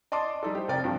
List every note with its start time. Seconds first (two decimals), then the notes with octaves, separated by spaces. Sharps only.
0.12 D5 D#5 A5 C6 D6
0.43 G3 D#4 A4
0.55 G4 C5
0.68 F1 A#4 D5 G5
0.84 G2 F3